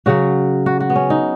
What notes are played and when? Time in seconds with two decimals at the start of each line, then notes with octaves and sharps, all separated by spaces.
0.06 C#3 F#3 F#4
0.66 F#4
0.80 F#4
0.90 B3
0.95 C#4
1.10 D#4